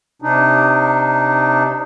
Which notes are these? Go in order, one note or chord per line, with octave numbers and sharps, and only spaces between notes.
C3 D4 D#4